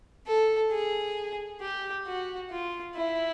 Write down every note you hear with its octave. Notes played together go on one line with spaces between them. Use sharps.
A4
G#4
G4
F#4
F4
E4